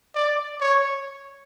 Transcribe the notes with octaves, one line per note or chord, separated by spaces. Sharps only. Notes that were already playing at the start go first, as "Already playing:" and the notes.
D5
C#5